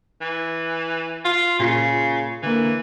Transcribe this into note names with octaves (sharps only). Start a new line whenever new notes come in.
E3
F4
A#2 C#3 F4
D3 E3 A#3